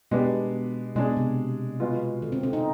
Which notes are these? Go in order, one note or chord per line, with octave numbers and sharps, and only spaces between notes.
B2 G#3 B3 D4 G4
B2 G#3 D4 G#4
C3
B2 G#3 B3 F4
D3
C4
C4
D#4